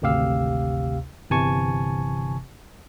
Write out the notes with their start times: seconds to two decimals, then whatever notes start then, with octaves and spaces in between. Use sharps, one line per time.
0.02 G#1 D2 C3 G4 F5 E6
1.30 G1 C3 E3 G#5 A5 C#6